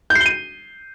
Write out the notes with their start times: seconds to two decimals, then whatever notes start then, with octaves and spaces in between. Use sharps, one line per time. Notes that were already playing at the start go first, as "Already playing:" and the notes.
0.10 G6
0.15 C7
0.20 G7
0.26 D#7